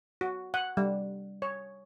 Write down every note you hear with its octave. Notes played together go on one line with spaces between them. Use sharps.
F#4
F#5
G3
C#5